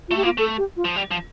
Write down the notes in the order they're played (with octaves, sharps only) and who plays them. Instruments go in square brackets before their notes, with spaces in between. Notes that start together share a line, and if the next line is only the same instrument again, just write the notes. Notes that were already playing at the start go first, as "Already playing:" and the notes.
[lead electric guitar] A3 [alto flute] F4
[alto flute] G4
[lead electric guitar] A#3 [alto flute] F4
[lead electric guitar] A3 [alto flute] A4
[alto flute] G4
F4
[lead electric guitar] F3
G3
F3